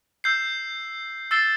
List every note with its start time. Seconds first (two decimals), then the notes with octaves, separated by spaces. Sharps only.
0.24 E6 G6 C7
1.31 E6 A6 C7 E7 G7